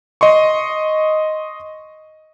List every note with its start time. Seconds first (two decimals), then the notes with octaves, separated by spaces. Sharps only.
0.21 D#5 C6 C#6